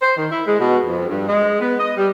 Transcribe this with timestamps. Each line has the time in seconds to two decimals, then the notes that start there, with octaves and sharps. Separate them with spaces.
0.01 C5
0.17 D#3
0.30 E4
0.46 G#3
0.59 B2
0.85 F2
1.08 G2
1.28 G#3
1.60 B3
1.78 D#5
1.96 G3